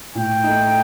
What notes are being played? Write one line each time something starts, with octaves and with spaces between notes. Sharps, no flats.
A2 G5
A3 D#4